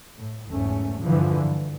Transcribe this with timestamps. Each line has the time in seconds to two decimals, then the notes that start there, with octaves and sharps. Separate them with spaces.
0.17 A2
0.47 F#1 E2 G#2 A3 C#4
1.02 G2 D3 E3 F3
1.39 G2